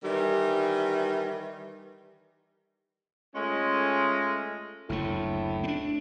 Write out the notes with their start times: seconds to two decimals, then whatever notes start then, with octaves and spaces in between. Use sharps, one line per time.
0.04 D#3 E3 G3
3.35 G#3 A3 C#4 F4 G#4 D#5
4.89 F#1 D2 A2 A3
5.64 C4 D4